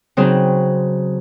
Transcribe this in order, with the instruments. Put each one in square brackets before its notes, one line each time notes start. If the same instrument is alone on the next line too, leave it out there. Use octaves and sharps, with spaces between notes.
[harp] C#3 F#3 C4 D#4 C5